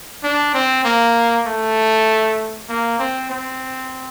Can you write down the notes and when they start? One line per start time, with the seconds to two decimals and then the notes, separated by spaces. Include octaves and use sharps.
0.24 D4
0.54 C4
0.85 A#3
1.46 A3
2.69 A#3
2.99 C4
3.30 C4